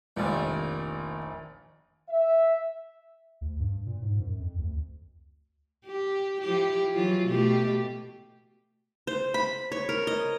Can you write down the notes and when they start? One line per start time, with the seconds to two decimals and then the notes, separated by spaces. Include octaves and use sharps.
0.17 F1 A#1 A#2 D#3
2.09 E5
3.41 D2
3.59 G2
3.86 A#2
4.02 G#2
4.20 F#2
4.39 F2
4.58 D2
5.86 G4
6.42 F3 E4 G4
6.94 E3 F#3 F4
7.27 B2 A3 G4
9.07 C5
9.34 B5
9.72 C#5
9.89 A#4
10.07 D#5